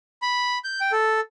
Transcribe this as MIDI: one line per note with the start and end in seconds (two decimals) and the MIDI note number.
0.22 0.58 83
0.64 0.80 91
0.81 0.92 79
0.92 1.20 69